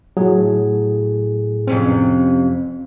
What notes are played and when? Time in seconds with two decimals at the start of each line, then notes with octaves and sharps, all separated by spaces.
0.17 A2 F#3 G#4
1.67 F2 C3 C4 C#4